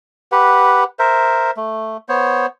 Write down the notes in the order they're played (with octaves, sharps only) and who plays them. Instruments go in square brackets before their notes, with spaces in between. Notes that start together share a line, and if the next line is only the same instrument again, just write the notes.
[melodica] G4 B4 F#5
A#4 C5 E5
A3
B3 C5 C#5